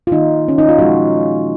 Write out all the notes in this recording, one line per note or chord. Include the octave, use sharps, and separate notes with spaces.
F4
D#3 A#3 D#4
C#4
D#4
F4
A#2 F3 G#3 F#4